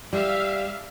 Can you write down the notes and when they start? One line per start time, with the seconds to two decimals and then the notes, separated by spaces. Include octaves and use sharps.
0.13 G3 E5 F5